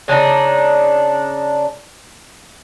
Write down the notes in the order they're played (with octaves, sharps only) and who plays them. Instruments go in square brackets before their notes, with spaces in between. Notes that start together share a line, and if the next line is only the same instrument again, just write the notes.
[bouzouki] C#3 D4 D#4